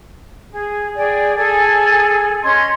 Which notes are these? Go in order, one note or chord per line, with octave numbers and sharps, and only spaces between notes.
G#4
G#4 D5 G5
G#4 A4 G#5
C#4 D#5 C6 G#6